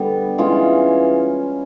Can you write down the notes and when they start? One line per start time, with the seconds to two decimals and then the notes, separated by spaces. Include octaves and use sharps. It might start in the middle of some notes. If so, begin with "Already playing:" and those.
Already playing: D3 G3 B3
0.38 E3 G#3 C#4 F4